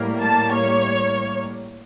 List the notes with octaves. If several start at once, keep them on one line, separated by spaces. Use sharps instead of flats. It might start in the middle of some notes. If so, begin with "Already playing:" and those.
Already playing: A2 G3 A#3
A5
C#5